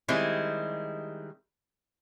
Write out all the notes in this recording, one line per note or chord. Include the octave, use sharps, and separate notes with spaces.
D#3 G3 G#3 C4 E4